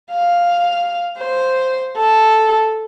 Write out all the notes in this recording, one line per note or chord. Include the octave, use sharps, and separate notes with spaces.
F5
C5
A4